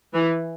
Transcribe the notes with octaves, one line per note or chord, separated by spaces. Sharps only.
E3